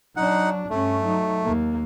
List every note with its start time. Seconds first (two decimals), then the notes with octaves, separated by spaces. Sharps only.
0.17 F#3 D4 D#4 F#5
0.70 G2 A3 C#4
1.03 F#3 D#4
1.44 D#2 A#3